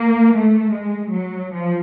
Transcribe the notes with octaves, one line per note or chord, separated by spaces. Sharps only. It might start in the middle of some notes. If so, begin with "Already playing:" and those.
Already playing: A#3
A3
G#3
F#3
F3